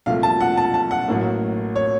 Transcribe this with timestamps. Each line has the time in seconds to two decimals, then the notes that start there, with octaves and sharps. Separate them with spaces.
0.06 C2 A#2 F3 A3 F5
0.23 A5
0.41 F#5
0.57 A5
0.74 A5
0.91 F#5
1.08 A1 A2 F#3 A#3
1.76 C#5